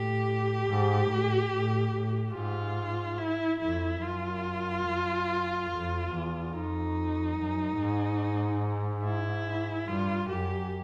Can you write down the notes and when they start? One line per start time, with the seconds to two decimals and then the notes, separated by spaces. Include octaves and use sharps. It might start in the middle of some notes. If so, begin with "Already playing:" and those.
Already playing: A2 G4
0.67 G#2
1.09 A2
1.51 A2
1.93 A2
2.35 G#2 F4
3.18 E4
3.60 F2 E4
4.02 F#2 F4
4.86 F#2
5.70 F2
6.12 E2
6.52 F2 D#4
7.37 F#2
7.78 G#2
9.04 E4
9.87 G2 F4
10.29 F#2 G4